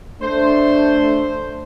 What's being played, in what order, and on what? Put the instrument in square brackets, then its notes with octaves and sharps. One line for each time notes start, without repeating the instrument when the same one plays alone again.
[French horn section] A3 D4 [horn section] C5